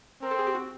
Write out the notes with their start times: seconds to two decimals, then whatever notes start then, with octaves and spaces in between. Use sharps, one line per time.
0.22 C4 A#4
0.31 A4
0.38 G#4
0.47 G4
0.55 F#4